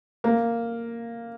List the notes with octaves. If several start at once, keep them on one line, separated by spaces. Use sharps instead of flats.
A#3